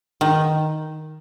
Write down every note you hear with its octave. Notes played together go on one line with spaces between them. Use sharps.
D#3